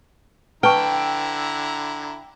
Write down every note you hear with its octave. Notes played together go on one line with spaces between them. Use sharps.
D3 E4 B4 G5 A5 A#5 C#6